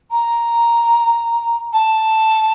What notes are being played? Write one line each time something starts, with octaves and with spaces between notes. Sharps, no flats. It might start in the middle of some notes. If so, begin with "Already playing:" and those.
A#5
A5